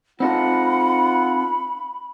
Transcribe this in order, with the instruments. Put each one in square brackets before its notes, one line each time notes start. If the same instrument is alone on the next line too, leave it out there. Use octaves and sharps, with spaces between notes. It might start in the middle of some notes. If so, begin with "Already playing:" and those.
[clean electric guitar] C4 D#4 A4 [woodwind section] F4 F#5 [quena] B5